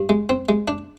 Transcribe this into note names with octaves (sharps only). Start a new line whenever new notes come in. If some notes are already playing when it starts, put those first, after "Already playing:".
Already playing: G2
G#3
C4
G#3
D4